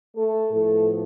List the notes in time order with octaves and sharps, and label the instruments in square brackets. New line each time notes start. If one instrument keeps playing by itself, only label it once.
[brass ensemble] A3 A4
A2 F3 A3 B3 A4